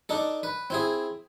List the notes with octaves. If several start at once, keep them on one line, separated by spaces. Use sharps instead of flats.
D4 D#4 A4
B4
C4 E4 G#4